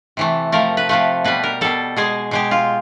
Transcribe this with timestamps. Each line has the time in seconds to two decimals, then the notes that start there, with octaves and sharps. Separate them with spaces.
0.17 C3 E3 A3
0.52 C3 F3 A3 A#4
0.77 B4
0.89 C3 F3 A3 B4
1.24 B2 G3 B4
1.43 A#4
1.61 B2 G3 A4
1.96 B2 G#3 G#4
2.31 B2 G#3 G4
2.51 F4